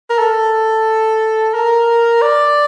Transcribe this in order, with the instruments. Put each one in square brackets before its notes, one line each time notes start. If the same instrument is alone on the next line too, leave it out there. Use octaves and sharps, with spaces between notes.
[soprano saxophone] A#4
A4
A#4
D5